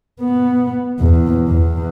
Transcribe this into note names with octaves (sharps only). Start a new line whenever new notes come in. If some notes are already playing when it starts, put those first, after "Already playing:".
B3
E2
E2